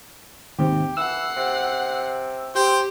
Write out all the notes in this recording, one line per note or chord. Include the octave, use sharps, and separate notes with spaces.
D#2 G#2 C3 G4
E3 F#5 E6 C7
C3
G4 C5 G5